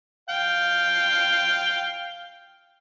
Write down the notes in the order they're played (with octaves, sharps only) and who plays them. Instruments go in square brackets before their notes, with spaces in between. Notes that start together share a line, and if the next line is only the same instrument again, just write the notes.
[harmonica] F5 G5